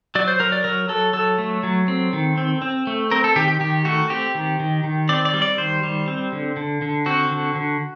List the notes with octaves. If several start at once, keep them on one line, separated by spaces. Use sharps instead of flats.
F#3 D5
C5
F#3 A#4
D5
F#3 A#4
F#3 A4
F#3 A4
A3
F#3
C4
D#3
C4
C4
A3
C4 A#4
A4
D#3 G4
G4
D#3 G4
A3 F#4
C4 G4
D#3
D#3
D#3
C4 D5
D5
G3
D5
D#3 C5
G3
C4
D3
D3
D3
C4 F#4
D3
D3